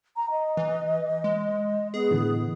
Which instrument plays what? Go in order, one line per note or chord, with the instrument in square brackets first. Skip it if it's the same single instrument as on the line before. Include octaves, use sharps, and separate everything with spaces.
[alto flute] A#5
D#5
[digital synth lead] E3
G#3
[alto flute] B3 [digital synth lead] G#4
[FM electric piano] A2 D3 E3